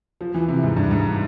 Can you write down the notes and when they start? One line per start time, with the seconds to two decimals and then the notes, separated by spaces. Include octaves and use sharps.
0.21 F3
0.34 E3
0.49 C3
0.63 G#2
0.77 G2
0.91 G#2